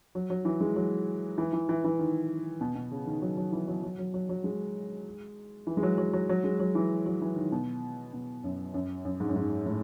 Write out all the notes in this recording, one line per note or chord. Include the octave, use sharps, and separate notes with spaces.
F#3
F#3
E3
G#3
F#3
E3
E3
E3
E3
D#3
B2
B2
C#3
D#3
F#3
F#3
E3
F#3
F#3
F#3
F#3
F#3
G#3
E3
G#3
F#3
F#3
F#3
F#3
G#3
F#3
E3
F#3
E3
D#3
B2
B2
F#2
F#2
F#2
G#2
F#2
G#2
A2